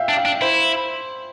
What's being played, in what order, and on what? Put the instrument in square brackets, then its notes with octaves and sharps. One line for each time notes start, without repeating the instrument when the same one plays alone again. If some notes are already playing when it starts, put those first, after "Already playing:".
Already playing: [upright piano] E5 F5 G5
[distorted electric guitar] D4
[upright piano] F5
[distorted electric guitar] D4
[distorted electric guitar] E4 [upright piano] C5